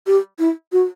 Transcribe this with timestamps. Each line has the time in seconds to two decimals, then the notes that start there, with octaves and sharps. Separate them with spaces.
0.07 G4
0.39 E4
0.72 F#4